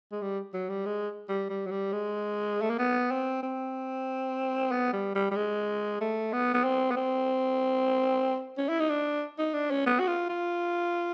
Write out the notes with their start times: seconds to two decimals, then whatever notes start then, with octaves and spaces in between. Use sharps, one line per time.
0.12 G#3
0.22 G3
0.54 F#3
0.70 G3
0.86 G#3
1.29 G3
1.50 G3
1.67 F#3
1.72 G3
1.93 G#3
2.62 A3
2.70 A#3
2.79 B3
3.11 C4
3.43 C4
4.72 B3
4.93 G3
5.15 G3
5.31 G3
5.36 G#3
6.01 A3
6.33 B3
6.54 B3
6.65 C4
6.91 B3
6.96 C4
8.58 C#4
8.69 E4
8.80 D#4
8.90 D4
9.39 D#4
9.54 D4
9.71 C#4
9.86 B3
10.00 F#4
10.07 F4
10.30 F4